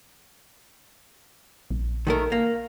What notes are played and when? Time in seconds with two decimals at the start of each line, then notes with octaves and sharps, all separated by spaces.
1.71 A#1
2.07 D#3 A3 A#4
2.32 A#3